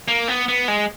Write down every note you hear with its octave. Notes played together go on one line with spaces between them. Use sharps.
A#3
B3
B3
G#3